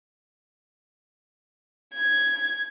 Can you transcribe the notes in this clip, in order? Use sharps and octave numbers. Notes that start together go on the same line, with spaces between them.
G#6